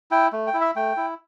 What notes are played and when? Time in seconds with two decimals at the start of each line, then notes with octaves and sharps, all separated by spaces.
0.11 E4 G5
0.33 A3
0.47 G5
0.54 E4
0.61 E5
0.76 A3 G5
0.97 E4